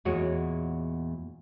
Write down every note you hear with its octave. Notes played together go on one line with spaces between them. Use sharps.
E2 A#2 G#3 F#4 C#5